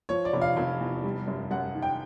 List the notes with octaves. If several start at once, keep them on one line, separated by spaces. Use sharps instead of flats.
F3 C#5
D5
F1
F5
F1
E2
G3
F#2
F#2 F#5
D#3
G5